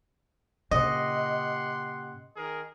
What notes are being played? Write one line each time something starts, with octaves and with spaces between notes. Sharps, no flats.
A#2 C#3 G4 D#5 F#5 C6
D#3 G#4 A#4